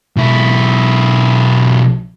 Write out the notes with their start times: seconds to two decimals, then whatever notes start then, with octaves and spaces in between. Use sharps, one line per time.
0.16 B1 E4